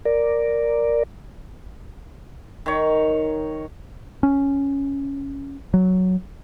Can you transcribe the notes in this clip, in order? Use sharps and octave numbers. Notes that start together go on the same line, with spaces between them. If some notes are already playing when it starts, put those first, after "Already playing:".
A#4 D5
D#3 C#5
C#4
F#3